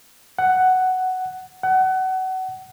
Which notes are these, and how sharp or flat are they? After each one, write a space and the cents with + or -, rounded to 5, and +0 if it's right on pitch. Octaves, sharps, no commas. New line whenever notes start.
F#5 +5
F#5 +25